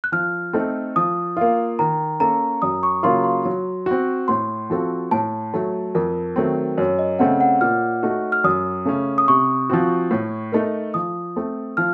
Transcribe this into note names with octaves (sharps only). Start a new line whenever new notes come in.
F#6
F3 F6
A3 C4 D#4 A4
F3 D#6
A#3 F4
D#3 A#5
A#3 C#4 A4 A#5
F#2 D#6
C#6
C#3 F#3 A#3 F4 C6
C6
F#3
C4 F#4
A2 C6
F3 C4 F#4 A4
A2 A5
F#3 A3
F2 A#4
D#3 F#3 A3 C4
F#2 C#5
D#5
C#3 A3 C4 F#5
F#5
A#2 F6
A3 D#4 F#4
F6
F#2 D#6
C#3 A3 C#4
D#6
C3 C#6
F3 C4 F#4
A2
A3 D#4 A#4
F3 D#6
A3 C4
F3 F6